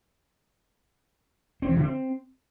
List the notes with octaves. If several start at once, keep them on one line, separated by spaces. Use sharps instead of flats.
C4
E3
D3
C4